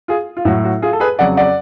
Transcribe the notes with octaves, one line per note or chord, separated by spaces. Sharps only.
F4 G#4
F4
A2 F#3 F#4
F#4
F4 G#4
A4
G#4 B4
F2 C#3 F#3 D5 F#5
D5 F#5